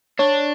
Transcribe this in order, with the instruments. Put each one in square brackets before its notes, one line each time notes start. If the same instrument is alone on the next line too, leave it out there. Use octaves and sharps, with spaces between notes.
[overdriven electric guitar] D4 [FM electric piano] C#5